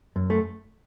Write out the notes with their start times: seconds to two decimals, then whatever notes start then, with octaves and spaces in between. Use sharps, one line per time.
0.16 F#2
0.30 A3